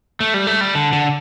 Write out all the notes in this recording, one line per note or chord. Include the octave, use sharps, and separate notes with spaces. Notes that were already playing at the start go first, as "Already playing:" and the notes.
A3
G3
A3
G3
D3
D3